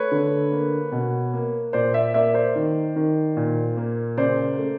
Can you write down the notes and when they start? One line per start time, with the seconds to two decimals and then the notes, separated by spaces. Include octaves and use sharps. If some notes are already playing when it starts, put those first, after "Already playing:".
Already playing: A3 B4 C#5
0.12 D3
0.52 A#3
0.92 B2
1.34 A#3
1.73 A#2 C5 D5
1.94 D5 E5
2.14 A#3 D5 E5
2.34 C5 D5
2.56 D#3
2.96 D#3
3.37 A#2
3.77 A#3
4.17 C#3 C5 D5
4.58 A3